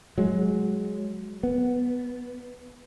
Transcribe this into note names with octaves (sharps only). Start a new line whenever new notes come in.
F#3 G#3
B3